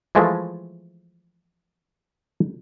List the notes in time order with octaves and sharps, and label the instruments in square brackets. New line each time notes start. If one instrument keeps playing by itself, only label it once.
[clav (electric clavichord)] E3 F3 G#3 A3